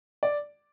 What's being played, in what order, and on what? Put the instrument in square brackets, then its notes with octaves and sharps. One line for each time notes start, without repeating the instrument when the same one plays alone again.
[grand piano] D5